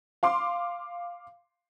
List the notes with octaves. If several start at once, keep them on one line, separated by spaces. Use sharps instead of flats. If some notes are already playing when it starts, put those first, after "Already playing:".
F5 C6 D6